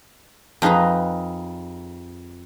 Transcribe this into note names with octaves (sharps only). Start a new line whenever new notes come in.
F2 D#4 G#4 B4 A#5